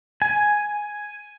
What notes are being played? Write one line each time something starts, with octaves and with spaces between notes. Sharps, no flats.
G#5